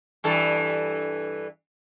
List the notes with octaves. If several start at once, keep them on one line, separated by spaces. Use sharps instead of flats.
G2 E3 A4